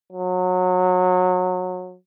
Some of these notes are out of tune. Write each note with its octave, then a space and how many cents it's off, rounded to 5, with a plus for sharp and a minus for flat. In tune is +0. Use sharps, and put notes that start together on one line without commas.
F#3 -25